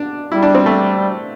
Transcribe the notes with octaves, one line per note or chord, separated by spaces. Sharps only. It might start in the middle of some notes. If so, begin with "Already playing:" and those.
Already playing: D4
G3 E4
D4
C4
A3